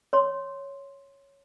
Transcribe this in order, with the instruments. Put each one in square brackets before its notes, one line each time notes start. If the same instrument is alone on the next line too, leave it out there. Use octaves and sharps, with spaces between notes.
[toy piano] C#5 C6